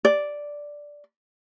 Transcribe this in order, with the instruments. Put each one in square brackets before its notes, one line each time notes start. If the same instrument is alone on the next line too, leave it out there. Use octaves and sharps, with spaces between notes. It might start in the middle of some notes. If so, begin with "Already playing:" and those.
[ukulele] D5